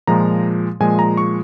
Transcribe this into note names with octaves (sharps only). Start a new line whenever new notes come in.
A#2 F3 G#3 A#5
A#2 F3 G#3 G#5
A#5
C#6